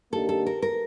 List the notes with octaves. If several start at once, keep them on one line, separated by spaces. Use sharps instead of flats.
D#2 D#3 A#3 D4 G4 A4
A4
A#4
A#4